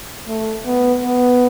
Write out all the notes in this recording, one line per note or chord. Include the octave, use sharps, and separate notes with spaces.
A3
B3
B3